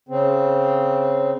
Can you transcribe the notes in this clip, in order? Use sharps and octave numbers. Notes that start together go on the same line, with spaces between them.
C#3 C4